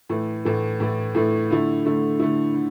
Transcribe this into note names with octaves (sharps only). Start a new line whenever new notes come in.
A2 E3 A3
A2 E3 A3
A2 E3 A3
A2 E3 A3
D3 A3 E4
D3 A3 E4
D3 A3 E4
D3